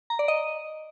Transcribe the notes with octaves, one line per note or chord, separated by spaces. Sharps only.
A#5
D5
D#5